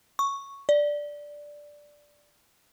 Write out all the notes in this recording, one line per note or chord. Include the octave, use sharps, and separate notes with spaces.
C#6
D5